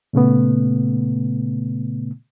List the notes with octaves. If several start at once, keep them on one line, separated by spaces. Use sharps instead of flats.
A#2 C#3 A3 B3